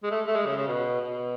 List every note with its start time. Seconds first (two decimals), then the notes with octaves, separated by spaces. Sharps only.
0.03 G#3
0.11 A3
0.27 A3
0.36 G#3
0.46 C#3
0.57 C#3
0.68 B2
1.01 B2